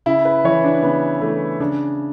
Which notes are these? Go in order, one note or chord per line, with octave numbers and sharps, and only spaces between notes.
C#3 E4
B4
E3 C#5
D4
C#3 B3
E3 A3
C#3 D4